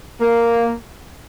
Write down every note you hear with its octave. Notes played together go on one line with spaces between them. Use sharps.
A#3